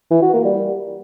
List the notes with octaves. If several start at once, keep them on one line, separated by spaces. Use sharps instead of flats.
E3
F#4
A#3
G3